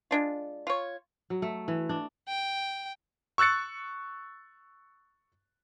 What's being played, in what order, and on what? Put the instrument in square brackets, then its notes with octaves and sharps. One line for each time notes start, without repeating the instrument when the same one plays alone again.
[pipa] G#3 D4 F4
F4 C#5
[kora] F#3
A3
E3
D4
[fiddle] G5
[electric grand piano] C#6 E6 F#6 A6 C#7